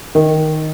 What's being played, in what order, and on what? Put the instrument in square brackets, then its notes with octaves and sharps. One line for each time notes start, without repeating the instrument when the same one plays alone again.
[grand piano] D#3